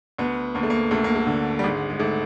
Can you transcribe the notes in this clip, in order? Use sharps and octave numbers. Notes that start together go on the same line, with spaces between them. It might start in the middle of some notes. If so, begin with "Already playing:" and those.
D2 B3
D2 A#3
A3
A#3
D2 A3
A#3
A3
D3
G3
G#1 G#3
G#3
G#1 A3